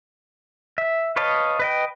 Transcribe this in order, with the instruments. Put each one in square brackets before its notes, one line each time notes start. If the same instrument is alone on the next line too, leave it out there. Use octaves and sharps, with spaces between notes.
[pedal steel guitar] E5
B4 C#5 D#5 F5 A5
B4 D#5 G5